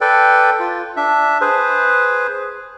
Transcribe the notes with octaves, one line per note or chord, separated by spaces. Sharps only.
A4 B4 D5 G5
F4
D4 E5
G#4 B4 C5